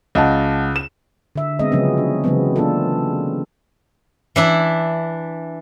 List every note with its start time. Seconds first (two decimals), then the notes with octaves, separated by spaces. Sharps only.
0.15 C#2 D#5 F#5 A5
0.76 E7
1.36 D3 E5
1.59 G#3 B3 C4 D#5
1.72 C#3 F3 F#3 G#3 B3 C#4
1.98 D4
2.24 C#3 E3 F#3 G#3 B3 C4
2.56 A#3 D4 F4 A4
4.36 E3 D4 E4